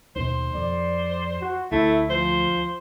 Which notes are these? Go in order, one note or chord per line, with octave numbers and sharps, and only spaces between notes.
D#2 B2 C5
F2 D5
F#4
D2 A3 E4
F3 C5